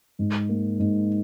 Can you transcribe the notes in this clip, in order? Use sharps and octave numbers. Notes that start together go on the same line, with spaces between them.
G#2
A#3
G#2